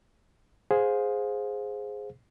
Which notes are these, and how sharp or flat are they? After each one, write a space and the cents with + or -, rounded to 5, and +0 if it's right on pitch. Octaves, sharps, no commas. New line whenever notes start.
G#4 +0 C5 +0 F5 +30